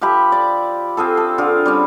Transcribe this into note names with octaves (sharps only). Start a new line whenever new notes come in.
F3 G4 E5 B5
D5
C4 F4 G#4 A4
A4
D3 F4 G#4 D6
G3 C4 C#4